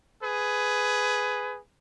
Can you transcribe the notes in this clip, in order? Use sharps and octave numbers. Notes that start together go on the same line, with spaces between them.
G#4 B4